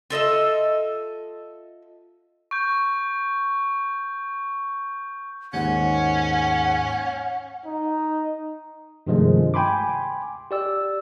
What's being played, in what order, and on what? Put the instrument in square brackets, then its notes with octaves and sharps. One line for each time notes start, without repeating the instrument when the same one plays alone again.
[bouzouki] F4 A4 D#5 E5
[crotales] C#6 G6
[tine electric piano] D#2 G#2 [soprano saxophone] C#4 [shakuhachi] F#5
[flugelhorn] D#4
[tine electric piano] G2 C3 D#3 F3 G#3 A3
G5 G#5 B5 C6 D6
G4 D5 E6